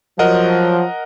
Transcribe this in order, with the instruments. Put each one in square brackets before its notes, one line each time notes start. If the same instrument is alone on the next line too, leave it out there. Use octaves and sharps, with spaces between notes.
[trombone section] F3 F#3 [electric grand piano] A#4 D#5 F#5